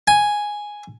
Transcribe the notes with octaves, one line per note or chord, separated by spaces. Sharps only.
G#5